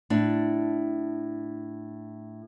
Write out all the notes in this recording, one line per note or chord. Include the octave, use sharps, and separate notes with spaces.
A2 D4